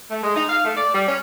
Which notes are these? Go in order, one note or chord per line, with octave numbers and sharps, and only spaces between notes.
A3
G#3
D#4
F5
A3
D5
G3
C#4